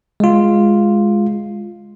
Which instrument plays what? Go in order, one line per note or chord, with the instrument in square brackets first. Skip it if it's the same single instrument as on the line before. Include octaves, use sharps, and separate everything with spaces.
[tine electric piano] G#3 F4